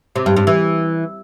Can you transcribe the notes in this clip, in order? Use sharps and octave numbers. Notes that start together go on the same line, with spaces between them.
C3
G2
G2
E3